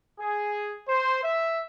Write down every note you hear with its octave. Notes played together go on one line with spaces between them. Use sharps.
G#4
C5
E5